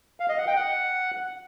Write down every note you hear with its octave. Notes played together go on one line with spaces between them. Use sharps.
F5
D#5
F#5
G5
F#5